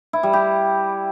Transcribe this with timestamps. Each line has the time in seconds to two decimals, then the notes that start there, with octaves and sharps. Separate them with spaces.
0.13 E4
0.23 G3
0.33 G4